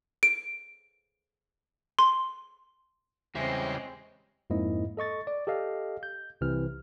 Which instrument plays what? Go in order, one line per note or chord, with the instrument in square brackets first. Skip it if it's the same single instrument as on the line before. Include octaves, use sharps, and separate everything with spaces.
[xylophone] D7
C6
[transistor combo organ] E2 C#3 G3 [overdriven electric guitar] G#3 [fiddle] C4 [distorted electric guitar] C#5 E5
[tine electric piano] F2 G#2 A#3 E4 D#5
A4 D#5 C#6 A6
D5
G4 A4 D#5 F5
G6
C2 C3 E3 F6